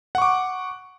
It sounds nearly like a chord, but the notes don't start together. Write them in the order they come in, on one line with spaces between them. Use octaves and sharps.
F#5 C#6 D6